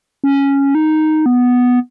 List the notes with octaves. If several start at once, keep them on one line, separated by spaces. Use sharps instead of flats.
C#4
D#4
B3